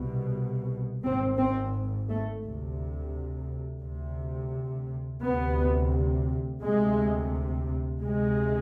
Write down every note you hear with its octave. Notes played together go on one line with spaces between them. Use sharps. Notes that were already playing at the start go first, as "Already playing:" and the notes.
Already playing: C2 B2
G#1 G#2 C4
C4
A3
D2 C3
D2 C3
D2 C3 B3
D2 C3 G#3
D2 C3 G#3